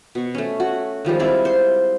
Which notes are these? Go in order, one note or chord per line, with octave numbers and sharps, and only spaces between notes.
B2 C#6
A3 C#4
F#4
D#3 F3 G3 G#3
C4 E4 D5 F5
C5